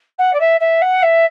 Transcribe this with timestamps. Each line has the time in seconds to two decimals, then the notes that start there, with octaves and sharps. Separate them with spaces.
0.18 F#5
0.33 D5
0.40 E5
0.60 E5
0.81 F#5
1.02 E5